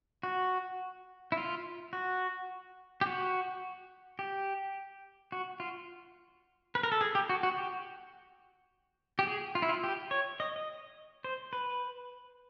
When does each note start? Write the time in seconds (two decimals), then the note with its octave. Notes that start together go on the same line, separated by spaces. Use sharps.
0.23 F#4
1.32 E4
1.37 F4
1.93 F#4
3.01 G4
3.06 F#4
4.19 G4
5.32 F#4
5.60 F4
6.75 B4
6.83 A#4
6.92 A4
7.01 G#4
7.15 G4
7.29 F#4
7.43 F#4
7.58 G4
9.19 G4
9.27 G#4
9.55 F4
9.62 E4
9.69 F4
9.84 G4
10.11 C#5
10.40 D#5
10.56 D#5
11.24 C5
11.53 B4